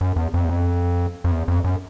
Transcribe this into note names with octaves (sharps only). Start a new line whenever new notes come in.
F#2
E2
F2
E2
F2
F2
E2
F2
F#2